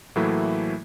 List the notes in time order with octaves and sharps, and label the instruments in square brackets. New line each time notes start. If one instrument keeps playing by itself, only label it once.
[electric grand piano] A2 E3 F#3 A3 A#3 E4